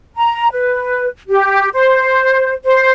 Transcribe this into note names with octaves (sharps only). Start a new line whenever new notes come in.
A#5
B4
G4
C5
C5